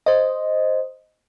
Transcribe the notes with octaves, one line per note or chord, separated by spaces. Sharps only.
C5 D#5